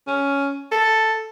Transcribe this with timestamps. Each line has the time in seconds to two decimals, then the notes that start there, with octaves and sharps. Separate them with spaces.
0.07 C#4
0.71 A4